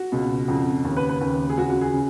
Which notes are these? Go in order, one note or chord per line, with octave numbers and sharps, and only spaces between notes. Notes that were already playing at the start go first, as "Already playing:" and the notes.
Already playing: F#4
C#2 B2
F2 C#3
D#2 C#3
B4
B4
D#2 C#3
G#4
C#2 C#3 F#4
F#4
G#4
C#3